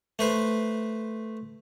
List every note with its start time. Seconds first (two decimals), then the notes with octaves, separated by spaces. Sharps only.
0.19 A3 B4 C5